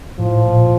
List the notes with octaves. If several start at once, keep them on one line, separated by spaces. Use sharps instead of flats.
A2 F3
A#2